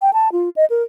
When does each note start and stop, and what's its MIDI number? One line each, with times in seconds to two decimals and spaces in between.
0.02 0.11 79
0.13 0.28 81
0.32 0.49 65
0.56 0.65 75
0.70 0.83 70